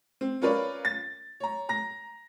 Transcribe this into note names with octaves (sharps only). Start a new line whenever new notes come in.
C4
C#4 F4 A#4 B4 C#5 D5
A6
C#5 A#5
A#5 A#6